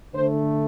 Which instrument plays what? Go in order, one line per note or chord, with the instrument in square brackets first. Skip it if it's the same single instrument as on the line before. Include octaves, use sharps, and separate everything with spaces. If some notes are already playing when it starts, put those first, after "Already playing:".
[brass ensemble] D3 A3 C5